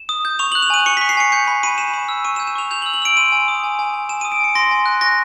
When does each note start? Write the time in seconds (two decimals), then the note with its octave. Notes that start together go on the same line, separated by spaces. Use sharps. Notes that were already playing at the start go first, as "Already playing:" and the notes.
Already playing: E7
0.09 D#6
0.25 G6
0.39 C#6 F7
0.52 F#6 F#7
0.62 F7
0.70 G#5 D#7
0.86 C#6 C#7
0.97 C#6 B6
1.09 C7
1.17 G#5 C#7
1.32 G6 C#7
1.48 B5
1.63 B5 D#7
1.78 B5 E7
1.94 B5
2.08 E6
2.25 C#6 D#7
2.36 E7
2.40 G6
2.47 E7
2.55 C#6 F7
2.71 G6 F7
2.82 F#7
2.86 E6
2.94 F#7
3.02 E6 D7
3.17 C6 D#7
3.32 G#5
3.48 D#6
3.64 G#5
3.79 G#5
3.93 G#5
4.09 G#5 E7
4.21 D#6 D#7
4.32 D7
4.40 G#5 C#7
4.55 C6 A#6
4.71 G#5
4.86 F#6
5.01 C#6 A#6